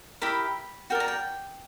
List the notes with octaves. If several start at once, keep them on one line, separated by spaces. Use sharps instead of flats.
E4 G4 A#4 B5
F#4 A#4 D5 G5
A#5
G5